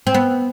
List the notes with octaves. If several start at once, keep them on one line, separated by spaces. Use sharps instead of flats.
C4
B3